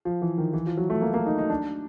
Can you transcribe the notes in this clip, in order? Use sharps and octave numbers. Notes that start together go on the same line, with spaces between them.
F3
E3
D#3
E3
F3
F#3
A3
A#3
A#3
D#4
D#4
D4